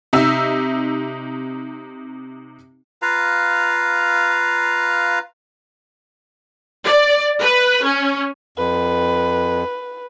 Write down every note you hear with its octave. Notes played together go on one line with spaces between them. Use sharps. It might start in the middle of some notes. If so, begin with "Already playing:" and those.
C3 D#4 E5 E6
F4 B4 F5 A#5
D5
B4
C#4
F2 B4